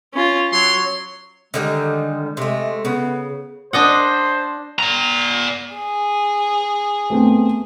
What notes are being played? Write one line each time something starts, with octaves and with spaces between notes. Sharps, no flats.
C#4 F4
F#3 C#5 C6
D3 D#3 G3 G#3
C3 G#3 A3
C#3 B3
D4 C5 D#5 F#5
D5 A#5
G#4
A3 B3 C4